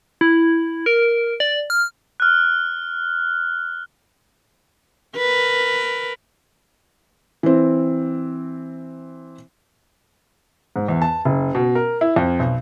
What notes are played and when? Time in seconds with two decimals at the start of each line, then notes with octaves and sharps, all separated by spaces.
0.21 E4
0.86 A#4
1.40 D5
1.70 F6
2.20 F6 F#6
5.17 A#4 B4
7.43 E3 C4
10.76 G#2
10.88 E2
11.02 A5
11.25 F#1
11.55 B2
11.75 A#4
12.01 E4
12.16 F2
12.39 B1